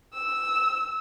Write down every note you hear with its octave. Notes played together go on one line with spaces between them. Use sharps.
E6